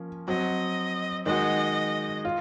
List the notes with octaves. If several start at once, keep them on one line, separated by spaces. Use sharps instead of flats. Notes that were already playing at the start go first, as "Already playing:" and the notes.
Already playing: F3 A#3 C#4
F#3 C4 F#4 D#5
D#3 G#3 D#4 F#4 D#5
F4